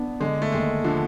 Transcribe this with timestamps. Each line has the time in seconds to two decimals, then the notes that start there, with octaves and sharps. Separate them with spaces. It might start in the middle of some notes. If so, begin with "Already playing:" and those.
Already playing: B3 D4
0.20 D3 G#3
0.42 A3
0.52 D#2 G#3
0.84 D3 F3